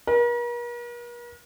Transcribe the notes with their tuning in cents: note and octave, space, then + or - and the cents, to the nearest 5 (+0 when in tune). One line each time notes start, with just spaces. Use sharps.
A#4 +45